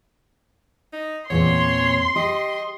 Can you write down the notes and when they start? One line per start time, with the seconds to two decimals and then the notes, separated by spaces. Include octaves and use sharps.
0.93 D#4
1.30 E2 A#2 C4 C#5 C6
2.16 G4 D#5